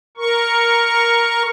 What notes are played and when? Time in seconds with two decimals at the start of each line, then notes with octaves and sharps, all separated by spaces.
0.18 A#4 C#6